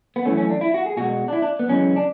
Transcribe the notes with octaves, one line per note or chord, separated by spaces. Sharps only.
B3
F#2 E3 A3 C#4
C#4
D4
E4
F#4
G#4
B2 G#3 F#4
D4
E4
D4
B3
F#2 C#3 E3 G#3 C#4
D4